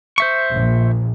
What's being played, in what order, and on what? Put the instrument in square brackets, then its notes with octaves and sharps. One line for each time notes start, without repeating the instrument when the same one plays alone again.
[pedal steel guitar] C5 E5 C#6
[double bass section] A#1